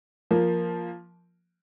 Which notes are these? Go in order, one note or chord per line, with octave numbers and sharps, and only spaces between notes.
F3 A#3